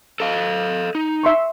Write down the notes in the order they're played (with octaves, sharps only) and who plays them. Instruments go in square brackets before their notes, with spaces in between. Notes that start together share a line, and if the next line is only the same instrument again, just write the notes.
[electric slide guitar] A4 D#5 F5
D#4
[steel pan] E5 C6 C#6